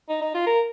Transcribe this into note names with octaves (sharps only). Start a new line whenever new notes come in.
D#4
D#4
F4
A#4